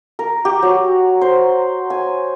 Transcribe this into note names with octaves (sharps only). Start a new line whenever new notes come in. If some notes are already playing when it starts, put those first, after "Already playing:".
A#4
G4
F#3
C5
G#5